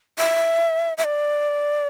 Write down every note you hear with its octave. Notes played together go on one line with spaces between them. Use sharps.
E5
E5
D5